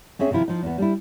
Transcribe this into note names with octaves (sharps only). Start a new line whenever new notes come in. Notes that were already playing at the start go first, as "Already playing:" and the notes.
C4 C#4 G#4 E5
C3 D#3 F3 E4 F4
F3 D#4
E2 B3
G3 D4 E4